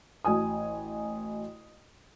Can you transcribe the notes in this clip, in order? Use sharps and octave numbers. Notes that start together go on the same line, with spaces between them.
A1 F#4 G#5 D#6